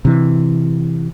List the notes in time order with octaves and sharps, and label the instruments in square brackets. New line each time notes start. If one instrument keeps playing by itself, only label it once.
[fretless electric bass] C3 E3